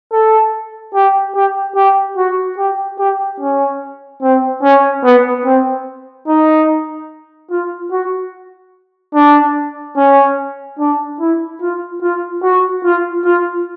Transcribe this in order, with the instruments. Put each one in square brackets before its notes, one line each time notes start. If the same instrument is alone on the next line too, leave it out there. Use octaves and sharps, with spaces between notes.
[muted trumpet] A4
G4
G4
G4
F#4
G4
G4
C#4
C4
C#4
B3
C4
D#4
F4
F#4
D4
C#4
D4
E4
F4
F4
F#4
F4
F4